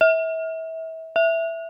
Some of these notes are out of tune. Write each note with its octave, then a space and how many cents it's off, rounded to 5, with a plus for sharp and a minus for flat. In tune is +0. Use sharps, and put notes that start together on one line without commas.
E5 -30
E5 +5